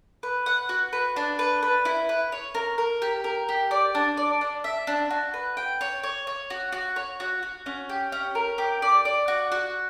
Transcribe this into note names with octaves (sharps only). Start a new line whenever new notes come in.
B4
F#5
F#4
B4
D4
B4
B4
E4
B4
C#5
A#4
A#4
G4
A#4
G4
D5
D4
D5
D4
E5
D4
F#4
B4
G5
C#5
C#5
C#5
F#4
F#4
C#5
F#4
F#4
C#4
G4
C#4
A#4
G4
D5
D5
F#4
F#4